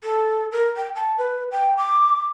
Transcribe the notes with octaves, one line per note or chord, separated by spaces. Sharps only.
A4
A#4
G5
A5
B4
G5
D6